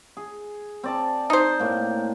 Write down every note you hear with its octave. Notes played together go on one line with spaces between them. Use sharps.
G#4
C4 D5 A5
D#4 C5
A2 A#3